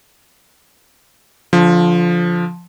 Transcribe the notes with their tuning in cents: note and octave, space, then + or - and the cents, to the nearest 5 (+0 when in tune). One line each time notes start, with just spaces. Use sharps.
D3 -20 F3 +0